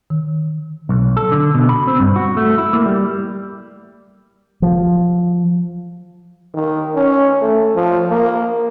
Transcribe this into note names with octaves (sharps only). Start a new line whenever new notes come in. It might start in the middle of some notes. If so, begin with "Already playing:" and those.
D#3
B1
A4
D3
B2
B5
C4
G2
F#4
A3
E4
A#3
G3
F3
D#3
C#4
A3
F3
A#3